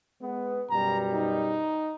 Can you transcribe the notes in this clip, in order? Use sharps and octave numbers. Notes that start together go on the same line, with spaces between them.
G#3 B3
F#2 B2 G3 A#5
D#4